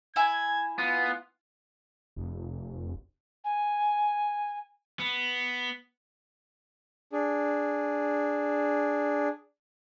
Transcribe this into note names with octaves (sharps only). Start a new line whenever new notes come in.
E4 G#5 G#6
B3 F4
F1
G#5
B3
D4 G#4